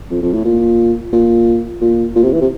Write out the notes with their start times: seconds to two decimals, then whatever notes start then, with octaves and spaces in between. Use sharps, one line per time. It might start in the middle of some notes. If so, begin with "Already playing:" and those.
0.10 F2
0.22 F2
0.33 A2
0.45 A#2
1.13 A#2
1.81 A#2
2.15 A#2
2.23 C3
2.32 E3
2.41 C3